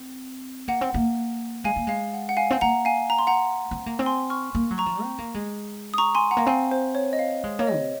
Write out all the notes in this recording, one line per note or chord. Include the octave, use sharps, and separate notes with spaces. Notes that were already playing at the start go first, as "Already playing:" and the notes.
Already playing: C4
A#3 F#5
C4
A#3
G#3 F5 G#5
A#3
G#3 F5
F#5
F#5
F5 G#5
C4
A#3 F#5 A#5
F5 G#5
A#5
C6
F#5 A#5
C4
A#3
C4
G#5 C6
C#6 F6
A#3
F#3
A#5 C#6
F3
C4
A#3
G#3
D#6
A#5 C#6
G#5 C6
F#5 A#5
A#3
C4 F5 G#5
C5
C#5
D#5
F5
G#3
A#3 C#5
D#5
C3